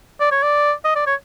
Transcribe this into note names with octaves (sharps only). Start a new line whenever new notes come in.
D5
C#5
D5
D#5
D5
C#5